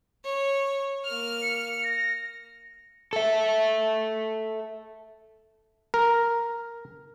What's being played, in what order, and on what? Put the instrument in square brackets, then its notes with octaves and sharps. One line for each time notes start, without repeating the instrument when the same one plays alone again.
[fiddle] C#5
[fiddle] A#3 F6 [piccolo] F7
[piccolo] C#7
A#6
[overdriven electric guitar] A4 E5
[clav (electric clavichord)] A#4